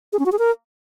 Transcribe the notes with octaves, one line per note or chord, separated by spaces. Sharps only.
G#4
C#4
F#4
G#4
A#4